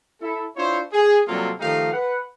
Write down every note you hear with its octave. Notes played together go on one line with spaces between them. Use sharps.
E4 A4
D4 E4 F4 C5 C#5
G#4
C3 F#3 G3 A#3 F4 A4
D#3 F3 A3 D#4 G4 F5
B4 F#5